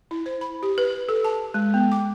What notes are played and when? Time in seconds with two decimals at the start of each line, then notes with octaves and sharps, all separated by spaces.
0.11 E4
0.26 C5
0.41 B5
0.63 G4
0.78 B4
1.09 A4
1.24 A5
1.54 G#3
1.74 B3
1.92 D6